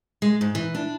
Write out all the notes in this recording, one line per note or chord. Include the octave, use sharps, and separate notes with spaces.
G#3
G#2
E3
D4